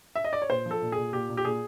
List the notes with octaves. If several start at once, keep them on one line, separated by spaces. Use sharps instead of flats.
E5
D#5
D5
C#5
A#2 C5
F3
A4
A#2
G#4
A#2
A#2 G4
A#2
G4
A#2 G#4